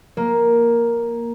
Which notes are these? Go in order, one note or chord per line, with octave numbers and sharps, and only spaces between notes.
A#3